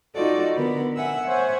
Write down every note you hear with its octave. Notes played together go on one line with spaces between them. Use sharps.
D#4 F4 F#4 A4 D5 D#5
D3 B3 A#4 B5
E5 F#5 G#5 E6
C5 C#5 E5 F#5 G#5